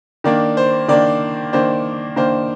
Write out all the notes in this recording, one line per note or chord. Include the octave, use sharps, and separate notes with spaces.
D#3 A#3 D4 D5
C5
D#3 A#3 D4 D5
D#3 A#3 D4 C5
D#3 A#3 D4 C5